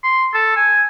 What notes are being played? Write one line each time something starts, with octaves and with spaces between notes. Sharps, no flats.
C6
A4
G#5